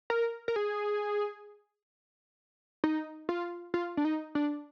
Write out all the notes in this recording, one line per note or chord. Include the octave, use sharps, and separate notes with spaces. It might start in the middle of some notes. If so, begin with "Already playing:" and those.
A#4
A#4
G#4
D#4
F4
F4
D4
D#4
D4